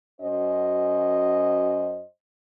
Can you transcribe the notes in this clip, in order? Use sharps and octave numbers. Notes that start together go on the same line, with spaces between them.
F#2 C#4 F#4 C5 D#5